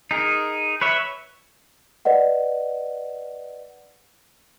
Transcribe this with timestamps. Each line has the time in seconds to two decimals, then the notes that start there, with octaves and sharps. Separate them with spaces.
0.11 D#4 G#4 A#4
0.82 B4 C#5 E5
2.05 B4 D5 D#5 F#5